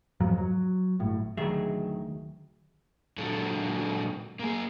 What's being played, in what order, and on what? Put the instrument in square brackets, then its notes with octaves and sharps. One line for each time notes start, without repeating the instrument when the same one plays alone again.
[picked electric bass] F2 G#2 F3 F#3
F#3
G1 A2
[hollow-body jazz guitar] D2 G#4 E5 [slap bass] D#3 F#3
[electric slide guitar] A#2 D3 F#3 G#3 F#4 A4
A#3 G#4